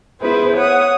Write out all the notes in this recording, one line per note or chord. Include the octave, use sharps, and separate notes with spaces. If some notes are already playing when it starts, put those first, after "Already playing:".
B3 E4 G#4 B4 C5
C#5 F#5 D#6